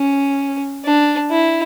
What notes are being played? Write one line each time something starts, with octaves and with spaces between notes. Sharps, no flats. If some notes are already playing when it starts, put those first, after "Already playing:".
Already playing: C#4
D4
E4